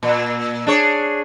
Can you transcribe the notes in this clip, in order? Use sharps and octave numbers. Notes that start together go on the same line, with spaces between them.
A#2
D4 G#4 C#5